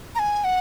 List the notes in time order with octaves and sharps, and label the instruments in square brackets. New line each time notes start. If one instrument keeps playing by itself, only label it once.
[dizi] A#5
G#5
F#5